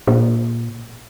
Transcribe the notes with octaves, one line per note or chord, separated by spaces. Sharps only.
A#2